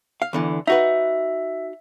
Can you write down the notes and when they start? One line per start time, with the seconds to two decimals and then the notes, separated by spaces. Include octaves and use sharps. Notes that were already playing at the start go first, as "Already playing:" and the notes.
0.22 F5
0.33 E2 D3 E3
0.67 D#4 F#4 B4 E5